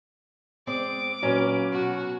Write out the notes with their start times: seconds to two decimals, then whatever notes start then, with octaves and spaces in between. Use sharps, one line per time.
0.67 G#3 C4 D5 D6
1.23 A#2 F#3 C#4 B4
1.72 B2 F#4